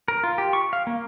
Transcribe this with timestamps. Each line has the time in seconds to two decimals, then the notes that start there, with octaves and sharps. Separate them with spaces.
0.08 A#4
0.24 F4
0.38 G4
0.53 C#6
0.73 F5
0.87 A#3